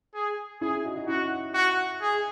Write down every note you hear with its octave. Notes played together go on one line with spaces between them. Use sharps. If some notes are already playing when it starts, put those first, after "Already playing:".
G#4
C#4 E4 G#4
D#4 F#4
D#4 F#4
C#4 E4 F#4
F#4
G#4